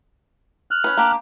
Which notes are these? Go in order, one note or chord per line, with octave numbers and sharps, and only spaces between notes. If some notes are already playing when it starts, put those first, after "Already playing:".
F6 F#6
C#4 B4
A#3 D4 G4